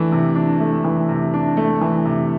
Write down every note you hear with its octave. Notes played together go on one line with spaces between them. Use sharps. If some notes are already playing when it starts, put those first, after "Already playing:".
Already playing: E3 A3 D4
C3
D4
A3
E3
C3
D4
A3
E3
C3